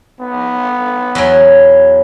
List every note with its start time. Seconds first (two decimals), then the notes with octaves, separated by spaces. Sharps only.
0.20 B3
1.15 E2 F#3